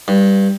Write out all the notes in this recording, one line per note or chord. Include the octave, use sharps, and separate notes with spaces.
G2